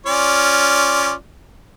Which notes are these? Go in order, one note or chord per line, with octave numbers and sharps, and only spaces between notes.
C#4 F4 D5